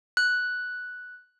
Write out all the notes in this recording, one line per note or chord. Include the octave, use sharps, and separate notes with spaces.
F#6